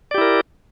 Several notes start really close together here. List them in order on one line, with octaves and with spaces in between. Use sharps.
D5 G4 E4 A#4